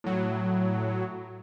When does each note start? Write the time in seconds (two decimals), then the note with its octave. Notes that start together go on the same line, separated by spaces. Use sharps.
0.04 A2 F#3